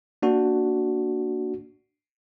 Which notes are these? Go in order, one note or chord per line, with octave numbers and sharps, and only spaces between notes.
A#3 D4 F#4